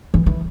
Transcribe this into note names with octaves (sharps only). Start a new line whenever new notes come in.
E3
E3